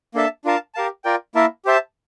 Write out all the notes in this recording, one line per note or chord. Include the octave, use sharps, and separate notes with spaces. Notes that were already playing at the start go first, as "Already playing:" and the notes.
A#3 D4 A4 E5 A5
D4 F4 A#4 F5 A5
G4 A#4 F5 A5
F4 A#4 D5 G5
A#3 E4 A#4 E5 A5
G4 C5 E5 A5